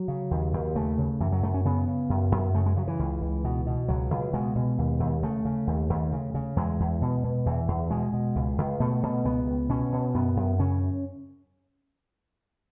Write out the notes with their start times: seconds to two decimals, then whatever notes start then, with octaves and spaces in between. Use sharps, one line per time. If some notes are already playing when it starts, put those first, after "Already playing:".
Already playing: F#3
0.08 C#3
0.31 D#2
0.53 D#2
0.75 C#3 A3
0.98 C#3
1.20 F#2 E3
1.32 F#3
1.43 F#2 A3
1.54 C#4
1.65 C#3 B3
1.88 C#3
2.10 F#2
2.32 F#2
2.54 C#3 A3
2.66 G#3
2.76 C#3 F#3
2.87 E3
2.99 C#2
3.21 C#2
3.44 B2
3.66 B2
3.88 C#2 F#3
4.10 C#2
4.33 B2 G#3
4.55 B2
4.78 D#2
5.00 D#2
5.23 C#3 A3
5.45 C#3
5.67 D#2
5.90 D#2
6.12 C#3
6.34 C#3
6.56 E2 G#3
6.80 E2
7.02 B2
7.24 B2
7.46 E2 E3
7.68 E2
7.90 B2 G#3
8.13 B2
8.36 C#2
8.58 C#2
8.80 B2 A3
9.03 B2
9.25 C#2 B3
9.47 C#2
9.69 B2 C#4
9.92 B2
10.15 F#2 B3
10.37 F#2
10.59 C#3 C#4